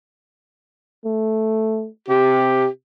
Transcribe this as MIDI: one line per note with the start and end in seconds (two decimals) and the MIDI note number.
1.05 1.88 57
2.09 2.67 48
2.09 2.68 67